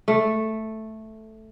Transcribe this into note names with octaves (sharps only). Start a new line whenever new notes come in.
A3